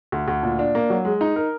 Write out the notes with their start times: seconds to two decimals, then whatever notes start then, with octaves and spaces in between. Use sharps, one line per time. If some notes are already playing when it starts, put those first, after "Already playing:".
0.12 D2
0.28 D2
0.43 A#2
0.59 D4
0.75 A#3
0.90 F#3
1.05 G#3
1.21 D#4
1.36 A#4